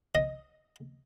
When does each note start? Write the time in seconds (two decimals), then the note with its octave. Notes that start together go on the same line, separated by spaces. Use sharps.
0.15 D#5